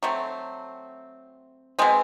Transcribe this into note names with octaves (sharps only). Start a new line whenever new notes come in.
F#3 A3 C4
B2 G#3 C4